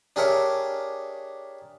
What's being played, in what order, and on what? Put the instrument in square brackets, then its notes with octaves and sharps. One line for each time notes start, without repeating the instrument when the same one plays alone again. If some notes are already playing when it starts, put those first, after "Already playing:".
[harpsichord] D4 G4 G#4 A#4 C#5 E5